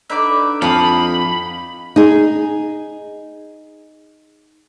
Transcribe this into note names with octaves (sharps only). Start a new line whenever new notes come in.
D3 D#4 B4 D5 E5
F2 F5 A#5 B5 D#6
D#4 G#4